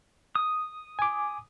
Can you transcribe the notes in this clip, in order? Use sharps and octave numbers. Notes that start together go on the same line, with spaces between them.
D#6
G#5 D6